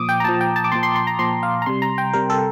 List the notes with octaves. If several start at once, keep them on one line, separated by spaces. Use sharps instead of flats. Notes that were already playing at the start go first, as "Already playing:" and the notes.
Already playing: A#2 F3 D6 D#6
G5
A#5
A#2 F3 A5
G5
A5
D6
A#2 F3 C6
C6
C6
A#5
A#2 F3 C6
F5
A#5
C3 G3 C6
A#5
G5
C3 G3 A#4
A4